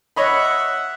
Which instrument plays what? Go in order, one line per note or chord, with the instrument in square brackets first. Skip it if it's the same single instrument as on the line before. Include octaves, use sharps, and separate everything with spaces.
[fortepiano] C#5 D#5 B5 [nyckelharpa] E5 F#5